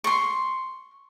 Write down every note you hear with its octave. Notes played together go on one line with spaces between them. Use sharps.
C6 C#6